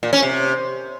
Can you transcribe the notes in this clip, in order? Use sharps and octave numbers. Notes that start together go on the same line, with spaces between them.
A#2
C#4
C3